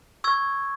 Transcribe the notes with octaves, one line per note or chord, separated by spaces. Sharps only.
C#6 E6 G#6